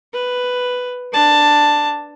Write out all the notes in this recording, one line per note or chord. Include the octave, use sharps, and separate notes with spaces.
B4
D4 A5